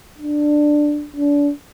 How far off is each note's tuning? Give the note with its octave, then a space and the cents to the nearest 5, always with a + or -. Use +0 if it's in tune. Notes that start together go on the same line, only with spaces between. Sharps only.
D4 +10
D4 -30